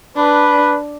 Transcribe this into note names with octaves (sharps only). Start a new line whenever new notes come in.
D4 B4